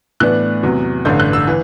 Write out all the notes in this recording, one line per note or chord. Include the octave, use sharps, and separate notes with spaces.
A2 E3 B3 D4 F#6
E2 C3 F#3
A1 G2 D3 G6
F#6
E6
E3